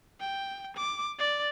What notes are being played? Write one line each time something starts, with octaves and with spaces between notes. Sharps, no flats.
G5
D6
D5